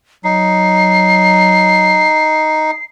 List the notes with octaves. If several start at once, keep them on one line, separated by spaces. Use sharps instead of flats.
F#3 D#4 C7